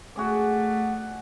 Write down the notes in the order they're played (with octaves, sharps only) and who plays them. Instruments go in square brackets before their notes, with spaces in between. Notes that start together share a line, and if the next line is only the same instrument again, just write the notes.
[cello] A3 [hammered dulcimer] F#4 G#4 D5 [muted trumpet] F#5